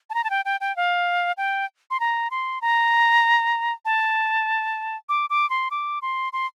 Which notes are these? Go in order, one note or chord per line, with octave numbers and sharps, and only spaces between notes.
A5
A#5
A5
G5
G5
G5
F5
G5
C6
A#5
C6
A#5
A5
D6
D6
C6
D6
C6
C6